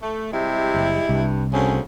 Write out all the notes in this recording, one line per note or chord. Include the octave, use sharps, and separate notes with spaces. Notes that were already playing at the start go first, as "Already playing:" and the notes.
A3
C3 G3 G#3 E4
F#1
C2 G2
D2 C#3 C4 C#4